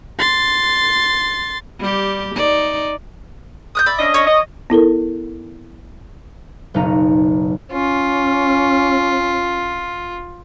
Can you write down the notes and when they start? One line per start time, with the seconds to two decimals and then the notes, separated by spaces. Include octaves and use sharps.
0.19 C6 A6
1.79 G3 G4
2.35 D#4 D5
3.75 D#6 F#6 G6
3.86 D5 E5 B5
3.99 C#4 D4 D#5
4.14 C#5
4.27 D#5
4.70 B3 E4 A4 A#4
6.74 F#1 B1 B2 D#4 F#5 A#5
7.72 C#4 F4